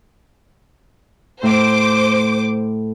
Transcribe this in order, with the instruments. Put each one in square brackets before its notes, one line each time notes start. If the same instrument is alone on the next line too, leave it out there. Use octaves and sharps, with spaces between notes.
[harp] A2 [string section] C5 D6